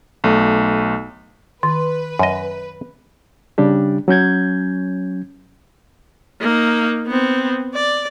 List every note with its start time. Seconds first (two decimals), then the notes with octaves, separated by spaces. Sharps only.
0.24 B1 A3
1.63 D#3 B4
2.19 F#2 D#5
3.58 C#3 G3 D4 G4
4.08 F#3 C#4 G6 G#6
6.41 A#3 D#4
7.07 B3 C4
7.74 D5